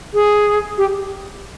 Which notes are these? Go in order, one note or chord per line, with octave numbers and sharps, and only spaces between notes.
G#4
G4